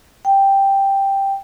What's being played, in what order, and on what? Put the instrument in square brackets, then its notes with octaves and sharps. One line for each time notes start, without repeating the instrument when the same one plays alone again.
[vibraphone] G5